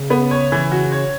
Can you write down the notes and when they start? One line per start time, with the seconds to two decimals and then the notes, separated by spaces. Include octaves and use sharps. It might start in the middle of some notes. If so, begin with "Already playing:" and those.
Already playing: C#3
0.10 B3
0.31 C#5
0.52 E3
0.71 F#4
0.92 C#5